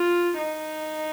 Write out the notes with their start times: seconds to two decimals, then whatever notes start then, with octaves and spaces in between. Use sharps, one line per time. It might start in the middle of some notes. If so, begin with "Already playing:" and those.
Already playing: F4
0.38 D#4